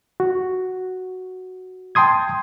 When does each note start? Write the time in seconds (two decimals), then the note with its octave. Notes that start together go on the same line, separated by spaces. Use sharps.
0.20 F#4
1.95 G5 A5 C6 D#6 G#6